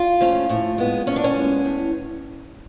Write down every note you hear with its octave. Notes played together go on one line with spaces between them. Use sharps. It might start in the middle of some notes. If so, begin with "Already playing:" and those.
Already playing: F4
F3 A3 C#4
A2
G#3 B3
A2 C#4
D4
C#4
G#3 B3
A2